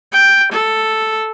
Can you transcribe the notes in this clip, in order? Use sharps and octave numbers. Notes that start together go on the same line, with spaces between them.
G5
A4